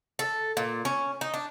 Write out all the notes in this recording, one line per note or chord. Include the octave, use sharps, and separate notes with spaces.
A4
A#2
C#4
D#4
D4